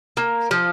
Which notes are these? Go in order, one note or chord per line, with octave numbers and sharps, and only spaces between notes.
A#3
F3